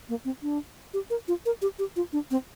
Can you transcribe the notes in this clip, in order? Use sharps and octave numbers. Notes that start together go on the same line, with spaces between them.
A#3
C4
D4
G4
A#4
F4
A#4
G4
G4
F4
D4
C4